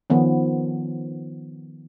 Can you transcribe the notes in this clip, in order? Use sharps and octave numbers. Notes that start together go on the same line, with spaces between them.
D#3 F3 B3 C#4